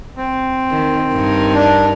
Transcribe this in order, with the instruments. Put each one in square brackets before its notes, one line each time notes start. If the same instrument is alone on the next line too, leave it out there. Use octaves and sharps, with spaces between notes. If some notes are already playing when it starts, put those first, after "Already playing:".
[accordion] C4
[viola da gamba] D#3
G2 D#4 A#4
[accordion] D4